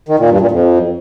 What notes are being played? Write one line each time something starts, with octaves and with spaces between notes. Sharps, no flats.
D#3
A#2
G2
A#2
F2